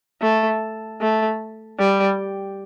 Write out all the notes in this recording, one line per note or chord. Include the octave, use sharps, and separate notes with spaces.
A3
A3
G3